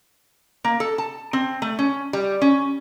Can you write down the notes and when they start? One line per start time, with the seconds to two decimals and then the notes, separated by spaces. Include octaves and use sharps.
0.64 A#3
0.80 A4
0.98 A5
1.33 C4
1.62 A3
1.79 C#4
2.13 G3
2.42 C#4